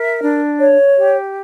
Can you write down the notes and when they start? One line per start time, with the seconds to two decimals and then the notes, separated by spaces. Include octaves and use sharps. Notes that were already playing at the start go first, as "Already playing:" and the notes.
Already playing: A#4 E5
0.21 D4
0.60 C#5
0.98 G4